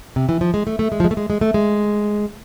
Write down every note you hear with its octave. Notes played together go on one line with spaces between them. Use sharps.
C3
E3
F3
G#3
A3
A3
G#3
F3
G#3
A3
G#3
G#3
A3
G#3